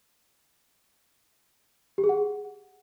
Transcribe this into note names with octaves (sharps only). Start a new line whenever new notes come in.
G4
G#4
F#5